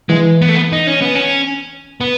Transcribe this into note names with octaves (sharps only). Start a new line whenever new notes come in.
E3 G#3
B3
A3
B3
D#4
C#4
B3
C#4
B3